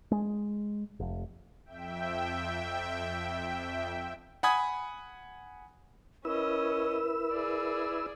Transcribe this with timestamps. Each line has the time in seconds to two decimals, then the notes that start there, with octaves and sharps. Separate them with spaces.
0.11 G#3
1.00 F1
1.66 F2 E5 G5
4.43 F#5 G#5 B5 D#6 G#6
6.25 C#4 E4 A#4 B4 D#5 E6
7.32 G#4 D5